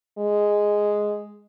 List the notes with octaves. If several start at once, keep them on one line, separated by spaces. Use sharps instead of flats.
G#3